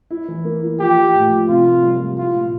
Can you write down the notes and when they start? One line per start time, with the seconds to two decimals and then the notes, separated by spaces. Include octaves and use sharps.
0.11 E4
0.28 E3
0.44 A#3
0.63 E4
0.80 F3 G4
0.97 F3
1.14 A2
1.31 F3
1.48 C3 F4
1.66 A#3
1.83 G3
2.00 G3
2.18 E4 F4
2.34 A#2